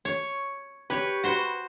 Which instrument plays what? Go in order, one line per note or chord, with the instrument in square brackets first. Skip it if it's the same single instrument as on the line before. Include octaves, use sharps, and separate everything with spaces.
[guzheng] C#5
[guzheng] G4 C#5 [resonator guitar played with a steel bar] B4
[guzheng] F#4 C5